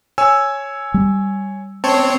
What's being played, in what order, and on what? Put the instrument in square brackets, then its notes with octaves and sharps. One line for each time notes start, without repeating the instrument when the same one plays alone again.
[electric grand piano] C#5 G#5 E6
[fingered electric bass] G3
[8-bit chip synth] C4 C#5 [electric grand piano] A5